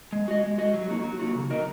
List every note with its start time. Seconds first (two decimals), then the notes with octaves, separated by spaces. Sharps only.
0.13 G#3
0.28 F#4 D#5
0.44 G#3
0.58 F#4 D#5
0.74 F#3
0.89 A#3 D#4 F#4
1.04 F#3
1.19 A#3 D#4 F#4
1.35 C#3
1.50 F#3 D#4 A#4 D#5